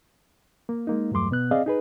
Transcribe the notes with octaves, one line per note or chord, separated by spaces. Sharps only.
A#3
G#3 A#3 D#4
E2 G2 F#3 A3 C6 D6
B2 B3 F#6
C4 G#4 D5 D#5 F5
D#4 G#4 B4